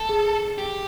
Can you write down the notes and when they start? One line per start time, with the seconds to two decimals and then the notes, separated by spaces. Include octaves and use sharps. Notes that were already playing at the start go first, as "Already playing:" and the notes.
Already playing: A4
0.09 G#4
0.58 G4